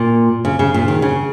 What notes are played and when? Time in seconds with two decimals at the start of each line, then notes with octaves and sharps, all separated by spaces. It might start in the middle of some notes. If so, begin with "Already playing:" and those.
Already playing: A#2
0.45 C#3
0.59 C#3
0.74 A#2
0.88 D#3
1.02 C#3